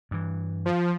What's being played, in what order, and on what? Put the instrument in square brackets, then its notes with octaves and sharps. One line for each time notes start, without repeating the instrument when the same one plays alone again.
[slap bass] G2 E3
[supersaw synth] F3